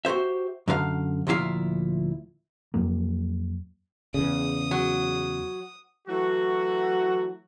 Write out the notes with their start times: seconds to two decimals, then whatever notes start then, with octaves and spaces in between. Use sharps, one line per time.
0.05 F#4 G4 A#4 C5 E5
0.68 F#2 D3 B4 F5
1.27 D2 A#2 F3 E4 G4 F5
2.74 F2 F#3 A#3
4.14 E2 C#3 D#6
4.71 F#3
6.08 E3 F#3 A3 F#4